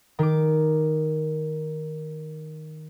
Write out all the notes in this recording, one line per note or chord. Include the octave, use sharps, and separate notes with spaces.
D#3 D6